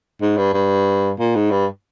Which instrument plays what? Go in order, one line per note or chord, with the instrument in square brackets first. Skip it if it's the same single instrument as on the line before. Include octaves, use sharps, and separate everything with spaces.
[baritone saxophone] G#2
G2
G2
A#2
G#2
G2